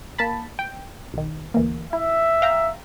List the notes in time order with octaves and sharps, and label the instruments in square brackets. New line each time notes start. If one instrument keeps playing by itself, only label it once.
[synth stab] A#3 A5 B5
G5
B1 D#3
D2 E3 A#3
[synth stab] E4 [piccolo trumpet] E5
[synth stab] F5 G5 A#5